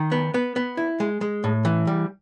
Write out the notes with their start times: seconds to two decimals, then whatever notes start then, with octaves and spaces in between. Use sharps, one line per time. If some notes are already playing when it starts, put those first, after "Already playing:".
Already playing: D#3
0.12 B3
0.34 B3
0.56 B3
0.77 E4
1.00 G#3
1.21 G#3
1.44 A2
1.65 E3
1.87 G3